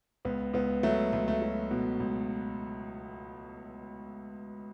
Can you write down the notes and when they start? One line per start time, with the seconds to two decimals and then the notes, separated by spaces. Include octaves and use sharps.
0.25 C#2 B3
0.54 C#2 B3
0.83 F#3 A3
1.13 C#2 A3
1.28 A3
1.42 F#3
1.71 B2
2.00 C#2